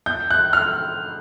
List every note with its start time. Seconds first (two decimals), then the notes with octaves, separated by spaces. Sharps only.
0.06 G6
0.31 F#6
0.53 F6